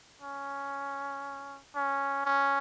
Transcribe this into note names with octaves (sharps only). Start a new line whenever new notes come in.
C#4
C#4
C#4